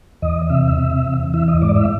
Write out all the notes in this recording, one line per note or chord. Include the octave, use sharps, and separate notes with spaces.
E2 D#5
C3 E5
E5
C3
E2
E3 E5
D#5
G#2 D5
E5